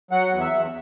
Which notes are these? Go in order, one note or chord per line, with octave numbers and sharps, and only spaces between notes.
F#3 F#5
E2
E5
E2